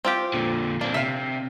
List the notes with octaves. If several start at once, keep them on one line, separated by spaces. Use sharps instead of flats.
C4 F4 G4
A#2 D3
A#3 C4 D4
C3 E5 F5